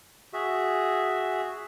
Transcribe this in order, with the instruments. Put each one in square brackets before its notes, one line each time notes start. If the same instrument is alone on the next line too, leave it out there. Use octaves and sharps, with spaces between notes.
[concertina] F#4 G#4 E5